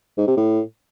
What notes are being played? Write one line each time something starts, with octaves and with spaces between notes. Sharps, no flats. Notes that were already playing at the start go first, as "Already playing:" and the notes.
G#2
C3
A2